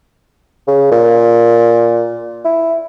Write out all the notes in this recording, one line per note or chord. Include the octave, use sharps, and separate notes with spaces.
C#3
A#2
E4